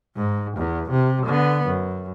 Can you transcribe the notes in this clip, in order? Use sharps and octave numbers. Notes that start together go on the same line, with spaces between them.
G#2
E2
C3
D3 B3
F#2